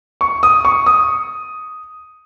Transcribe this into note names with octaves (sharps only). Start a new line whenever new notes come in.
C#6
D#6
C#6
D#6